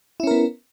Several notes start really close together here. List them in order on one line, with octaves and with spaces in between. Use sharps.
E4 C#4 A#4 B3